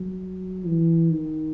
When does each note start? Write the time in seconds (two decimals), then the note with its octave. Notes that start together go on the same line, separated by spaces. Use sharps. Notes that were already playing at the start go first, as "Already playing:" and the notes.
Already playing: F#3
0.66 E3
1.11 D#3